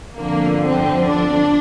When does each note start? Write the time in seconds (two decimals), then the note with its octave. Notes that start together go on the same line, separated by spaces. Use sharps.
0.18 G1 F2 D3 F3 A#3
0.65 C4
1.09 D4